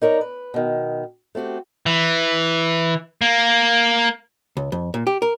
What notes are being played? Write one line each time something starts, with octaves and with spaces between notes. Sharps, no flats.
D#4 A#4 C#5 D5
B4
B2 D#3
A3 C4 F#4 G4
E3
A#3
C#2
F2
A#2
G4
A#4